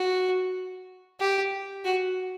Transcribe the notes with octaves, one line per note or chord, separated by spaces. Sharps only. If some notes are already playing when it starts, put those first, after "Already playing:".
Already playing: F#4
G4
F#4